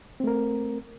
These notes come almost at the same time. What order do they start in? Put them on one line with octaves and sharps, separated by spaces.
C4 A3 A#4